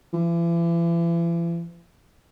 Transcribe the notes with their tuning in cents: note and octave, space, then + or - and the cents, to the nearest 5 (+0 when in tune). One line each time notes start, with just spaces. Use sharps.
E3 +40